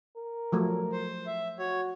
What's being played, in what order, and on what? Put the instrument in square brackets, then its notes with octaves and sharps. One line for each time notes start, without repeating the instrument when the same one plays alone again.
[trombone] A#4
[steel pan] F3 F#3 A3
[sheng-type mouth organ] C5
E5
[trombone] F#4 [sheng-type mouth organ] C#5